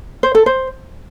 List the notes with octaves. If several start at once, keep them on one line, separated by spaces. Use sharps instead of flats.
C5
A4
C5